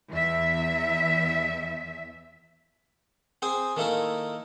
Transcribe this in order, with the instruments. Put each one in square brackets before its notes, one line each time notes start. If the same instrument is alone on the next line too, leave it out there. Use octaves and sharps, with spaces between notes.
[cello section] E2 E5
[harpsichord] C4 G#4 C5 G5 G#5
D#3 A3 A#3 E4 A4 A#4